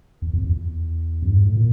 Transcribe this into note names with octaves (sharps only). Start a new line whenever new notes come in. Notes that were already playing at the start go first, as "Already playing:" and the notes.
E2
F2
E2
F#2
G#2
G2
A2
A#2